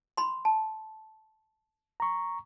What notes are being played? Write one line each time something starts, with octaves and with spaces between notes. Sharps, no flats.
B5 C6
A5
A#5 C#6